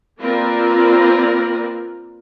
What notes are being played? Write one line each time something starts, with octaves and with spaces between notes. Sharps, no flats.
A#3 C4 F4 A#4 B4 D5